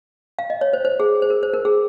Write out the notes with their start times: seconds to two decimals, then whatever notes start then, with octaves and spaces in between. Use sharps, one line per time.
0.39 F5
0.50 D#5
0.61 C#5
0.73 C5
0.85 C5
1.00 G#4
1.22 C5
1.30 A#4
1.43 C5
1.53 A#4
1.65 G#4